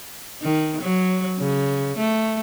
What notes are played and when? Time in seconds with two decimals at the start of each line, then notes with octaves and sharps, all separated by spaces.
0.42 D#3
0.81 F#3
1.39 C#3
1.98 A3